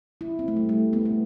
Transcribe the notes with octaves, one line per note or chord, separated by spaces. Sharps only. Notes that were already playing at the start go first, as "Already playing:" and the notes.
E4
C4
A3
G3
A3
B3
A3